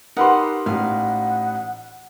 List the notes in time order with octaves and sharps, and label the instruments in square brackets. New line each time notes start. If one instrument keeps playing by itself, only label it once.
[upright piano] D#4 B4 C6 [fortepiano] G4 A#4 [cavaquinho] F#5
[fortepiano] A1 [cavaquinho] F5 [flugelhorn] F#5